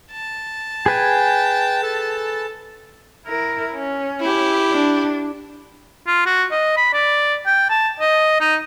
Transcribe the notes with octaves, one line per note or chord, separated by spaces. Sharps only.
A5
G#4 B4 G5 G#5
A4
E4 A#4
C#4
E4 G4
D4
F4
F#4
D#5
B5
D5
G5
A5
D#5
D#4